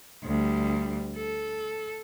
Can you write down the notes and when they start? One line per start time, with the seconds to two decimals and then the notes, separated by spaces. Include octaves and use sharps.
0.23 D2 G3
1.17 A4